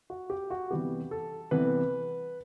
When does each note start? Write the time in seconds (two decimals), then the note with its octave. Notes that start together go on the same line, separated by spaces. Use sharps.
0.10 F#4
0.30 G4
0.50 F#4
0.71 C3 E3 G3 B3 G4
1.11 A4
1.51 C3 E3 G3 B3 B4